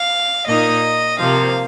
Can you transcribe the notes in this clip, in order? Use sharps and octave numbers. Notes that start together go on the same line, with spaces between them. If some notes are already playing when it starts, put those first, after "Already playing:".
Already playing: F5
A#2 A#3 D#4 D#5
C3 F3 A#3 F5